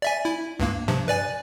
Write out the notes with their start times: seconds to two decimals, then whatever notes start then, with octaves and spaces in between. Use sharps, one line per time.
0.02 D5 E5 G#5
0.25 E4
0.59 C#2 G2 A#3
0.88 G2 C3 F3
1.08 B4 D5 G#5